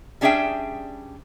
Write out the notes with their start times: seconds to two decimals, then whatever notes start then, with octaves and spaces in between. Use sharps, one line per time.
0.21 G3 C#4 D4 G#4 E5 G5